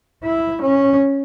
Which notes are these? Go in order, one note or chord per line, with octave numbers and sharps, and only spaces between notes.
E4
C#4